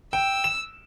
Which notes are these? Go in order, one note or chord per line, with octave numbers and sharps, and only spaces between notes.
G5 E6
E7